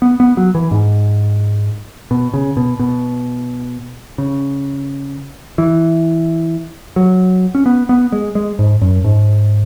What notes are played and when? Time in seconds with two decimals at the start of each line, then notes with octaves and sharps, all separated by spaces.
0.02 B3
0.20 B3
0.37 F#3
0.55 E3
0.71 G#2
2.11 B2
2.34 C#3
2.57 B2
2.80 B2
4.18 C#3
5.58 E3
6.96 F#3
7.55 C#4
7.66 B3
7.89 B3
8.12 G#3
8.35 G#3
8.59 G#2
8.82 F#2
9.04 G#2